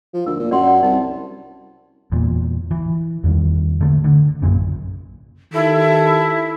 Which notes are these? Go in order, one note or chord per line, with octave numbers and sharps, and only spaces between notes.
F3
D2 A#4
A#2
F#2 D5 F#5 C6
D5 F#5
C2 D#4
E2 A#2
E3
E2 D#3 G3
D3 G#3 A3
D3
A#1 F#2 A#2 C#3
D#3 E4 G4 A4